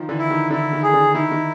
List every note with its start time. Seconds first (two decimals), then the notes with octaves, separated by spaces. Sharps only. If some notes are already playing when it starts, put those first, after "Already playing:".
Already playing: D#3 F3
0.09 D3 E3
0.19 E4
0.30 D#3
0.51 D3 E4
0.73 D#3
0.83 G#4
0.94 D3
1.14 D#3 E4
1.32 D#3